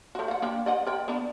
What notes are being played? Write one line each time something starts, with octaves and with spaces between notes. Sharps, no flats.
A3 F#4
F5 F#5
A#3 D4 G4
D5 D#5 F#5
A#4 D5 G5
B3 D4